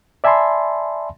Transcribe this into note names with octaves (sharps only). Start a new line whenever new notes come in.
D5 E5 G#5 A5 B5 C6